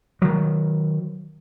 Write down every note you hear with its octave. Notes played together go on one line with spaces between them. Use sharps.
D#3 F#3